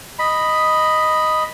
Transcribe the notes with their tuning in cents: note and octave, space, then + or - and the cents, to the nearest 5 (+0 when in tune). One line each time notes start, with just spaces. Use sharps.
D#5 +0 B5 +0